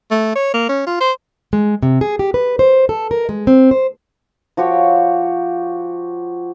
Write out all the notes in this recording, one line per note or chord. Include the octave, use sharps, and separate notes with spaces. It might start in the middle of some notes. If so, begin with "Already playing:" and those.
A3
C#5
A#3
C#4
F4
C5
G#3
C3
G#4
G4
B4
C5
A4
A#4
G#3
C4
C5
F3 F#4 G4 C#5